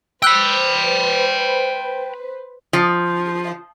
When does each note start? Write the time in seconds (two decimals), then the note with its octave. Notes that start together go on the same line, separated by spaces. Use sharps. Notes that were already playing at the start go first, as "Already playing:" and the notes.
0.23 B4 C5 G5 B5 E6 F#6
2.73 F3